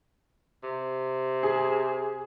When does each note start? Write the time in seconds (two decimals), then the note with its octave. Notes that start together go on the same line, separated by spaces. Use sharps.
0.63 C3
1.43 G#4